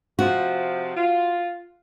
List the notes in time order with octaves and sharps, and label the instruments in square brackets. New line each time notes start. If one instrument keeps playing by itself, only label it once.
[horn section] C3 F3 [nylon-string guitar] F#4
[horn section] F4